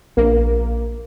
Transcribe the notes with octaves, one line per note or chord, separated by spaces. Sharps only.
A#1 A#3